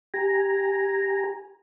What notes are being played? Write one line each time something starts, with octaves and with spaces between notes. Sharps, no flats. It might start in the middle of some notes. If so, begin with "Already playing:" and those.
G4 G#5 A#5